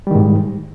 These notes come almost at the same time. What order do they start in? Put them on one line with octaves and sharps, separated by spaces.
G3 D#3 G#2